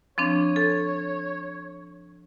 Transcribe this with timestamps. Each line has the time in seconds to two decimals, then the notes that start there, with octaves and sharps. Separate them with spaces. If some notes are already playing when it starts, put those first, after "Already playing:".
0.18 F3 C4 D4 C#5
0.56 A4